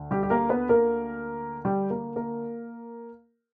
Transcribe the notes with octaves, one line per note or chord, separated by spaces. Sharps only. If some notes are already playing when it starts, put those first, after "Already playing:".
Already playing: D2
G3 G4
G4
A#3 A#4
B3 B4
A#3 A#4
G3 G4
A#3 A#4
A#3 A#4